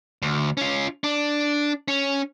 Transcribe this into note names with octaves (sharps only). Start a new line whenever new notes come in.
D2
C#4 F4
D4
C#4